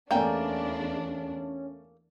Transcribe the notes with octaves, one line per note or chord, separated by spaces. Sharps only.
E2 A3 A#3 C#4 D4 D5 G5 G#5